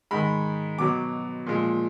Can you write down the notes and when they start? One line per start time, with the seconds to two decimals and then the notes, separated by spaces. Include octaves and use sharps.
0.11 G#2 D#3 G#3 B5
0.78 B2 F#3 D6
1.46 A#2 F3 G#3